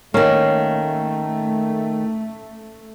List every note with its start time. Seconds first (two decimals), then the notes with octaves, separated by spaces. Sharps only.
0.14 D#3 A3 A#3 C#4